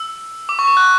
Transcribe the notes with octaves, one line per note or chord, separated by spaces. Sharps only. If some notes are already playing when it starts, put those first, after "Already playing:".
Already playing: E6
D6
C#6
D6
F#6